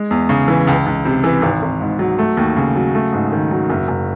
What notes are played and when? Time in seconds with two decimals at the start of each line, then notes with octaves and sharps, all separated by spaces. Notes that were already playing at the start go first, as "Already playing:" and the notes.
Already playing: G#3
0.11 E2
0.29 C#3
0.48 E3
0.67 C#2
0.86 C#2
1.05 C3
1.24 E3
1.42 G#1
1.62 G#1
1.81 G#2
1.99 F#3
2.18 A3
2.37 D#2
2.56 C#3
2.75 F#3
2.95 A3
3.13 G#2
3.32 D#3
3.51 F#3
3.70 F#1
3.88 F#1